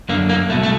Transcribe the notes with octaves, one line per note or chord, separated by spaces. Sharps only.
F#2 D3 A#3
A#3
C2 B2 A3
A3